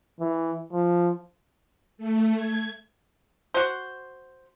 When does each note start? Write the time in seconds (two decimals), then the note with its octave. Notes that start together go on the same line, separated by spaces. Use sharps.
0.20 E3
0.72 F3
1.98 A3
2.35 G#6
3.54 F#4 C5